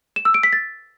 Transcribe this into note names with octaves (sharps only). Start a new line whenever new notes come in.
E7
E6
D7
B6
A6